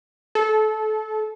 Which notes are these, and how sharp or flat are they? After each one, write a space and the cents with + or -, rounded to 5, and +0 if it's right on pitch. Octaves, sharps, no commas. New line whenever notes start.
A4 -25